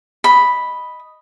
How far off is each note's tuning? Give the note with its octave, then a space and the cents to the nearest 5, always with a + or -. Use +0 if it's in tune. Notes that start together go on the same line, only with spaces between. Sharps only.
D#5 +0 B5 +0